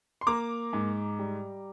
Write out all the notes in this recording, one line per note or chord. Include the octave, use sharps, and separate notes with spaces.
C6
A#3 A#5 D6
G#2
G3